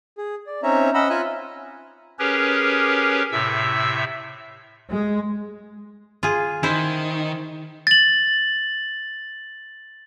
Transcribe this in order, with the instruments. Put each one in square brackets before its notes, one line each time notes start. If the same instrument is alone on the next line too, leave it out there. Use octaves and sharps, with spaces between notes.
[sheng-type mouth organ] G#4
D5
C4 C#4 D#4 C#5 E5 A#5
C#4 D#5 F#5 B5 E6
F4 E5 G#5 A#5 F#6
[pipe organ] C#4 G4 G#4 A#4 B4 C#5
A2 C3 E5 E6
[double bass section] G#3
[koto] F4 G#4
[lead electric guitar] D#3 [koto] E4 C5
[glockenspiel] A6 F#7